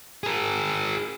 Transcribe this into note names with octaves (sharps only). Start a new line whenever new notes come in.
G#4 A#4